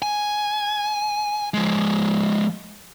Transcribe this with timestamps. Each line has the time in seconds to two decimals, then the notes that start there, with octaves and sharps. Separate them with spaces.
0.02 G#5
1.54 F3 G#3